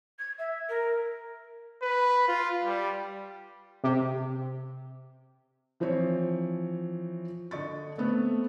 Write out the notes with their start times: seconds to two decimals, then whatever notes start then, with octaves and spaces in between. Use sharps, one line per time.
0.19 G#6
0.39 E5
0.69 A#4
1.82 B4
2.28 F4
2.63 G3
3.84 C3
5.80 E3 F3 C4 C5 C#5
7.51 D3 D#5 C#6 A6
7.98 A3 B3 C4